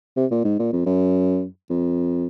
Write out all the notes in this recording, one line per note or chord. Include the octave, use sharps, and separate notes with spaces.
C3
A#2
G#2
A#2
F2
F#2
F2